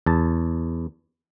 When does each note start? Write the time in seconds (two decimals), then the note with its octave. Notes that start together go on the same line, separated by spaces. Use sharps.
0.06 E2 A5